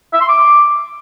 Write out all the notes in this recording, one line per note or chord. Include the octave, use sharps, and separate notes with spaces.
E5
C6
D6